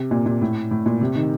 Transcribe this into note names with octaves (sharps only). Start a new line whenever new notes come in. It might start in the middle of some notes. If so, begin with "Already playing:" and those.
Already playing: C3
A#2
A#2
A2
A2
A#2
C3
D#3